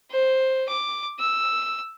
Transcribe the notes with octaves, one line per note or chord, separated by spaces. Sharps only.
C5
D6
E6